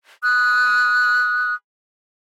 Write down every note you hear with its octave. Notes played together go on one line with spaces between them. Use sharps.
D#6 F#6